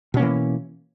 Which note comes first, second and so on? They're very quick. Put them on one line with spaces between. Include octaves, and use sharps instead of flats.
B2 C#4 A#3 E3